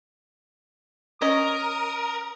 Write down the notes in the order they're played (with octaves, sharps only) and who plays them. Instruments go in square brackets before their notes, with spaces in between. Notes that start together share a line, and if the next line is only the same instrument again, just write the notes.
[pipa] C#4 D#5 [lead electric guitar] A#4 [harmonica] D#6